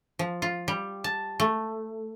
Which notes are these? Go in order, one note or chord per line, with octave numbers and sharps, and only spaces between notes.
F3
F4
G3
A5
A3